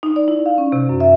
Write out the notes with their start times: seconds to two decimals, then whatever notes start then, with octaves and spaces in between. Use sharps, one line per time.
0.03 D#4
0.16 D5
0.28 E4
0.46 F5
0.58 C#4
0.72 C3
0.89 F#2
1.00 E5